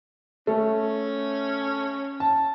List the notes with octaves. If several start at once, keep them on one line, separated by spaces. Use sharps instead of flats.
A3 C#4
A5